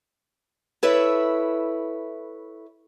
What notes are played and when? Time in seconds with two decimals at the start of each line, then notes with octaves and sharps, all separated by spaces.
0.83 E4 A4 B4 C#5 E5